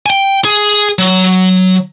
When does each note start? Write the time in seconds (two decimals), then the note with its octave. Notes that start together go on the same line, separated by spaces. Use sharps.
0.06 G5 G#5
0.45 G#4
0.99 F#3